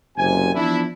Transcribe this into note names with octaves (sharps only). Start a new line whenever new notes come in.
F#1 C3 G#5
E3 F3 B3 D4 E4